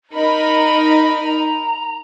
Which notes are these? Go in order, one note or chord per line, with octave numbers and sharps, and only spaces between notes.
D#4 A#4 D#5 B5
A#5